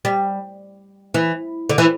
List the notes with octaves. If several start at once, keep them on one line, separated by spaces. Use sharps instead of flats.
G3
E3
D3
E3